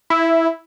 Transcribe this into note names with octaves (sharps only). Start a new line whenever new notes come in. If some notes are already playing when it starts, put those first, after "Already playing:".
E4